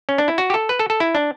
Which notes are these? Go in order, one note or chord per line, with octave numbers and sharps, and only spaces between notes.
C#4
D4
E4
F#4
G4
A4
B4
A4
A4
E4
D4